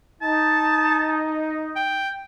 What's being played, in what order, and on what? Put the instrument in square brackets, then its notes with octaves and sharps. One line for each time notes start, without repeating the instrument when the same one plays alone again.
[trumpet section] D#4 [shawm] A5
[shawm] G5